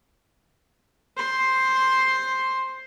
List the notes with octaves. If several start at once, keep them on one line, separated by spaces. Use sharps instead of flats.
C5 C6